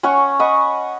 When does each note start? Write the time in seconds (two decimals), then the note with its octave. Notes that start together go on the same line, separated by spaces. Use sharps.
0.03 C#4 C#5 F#5 C#6
0.39 D#5 F#5 B5 C#6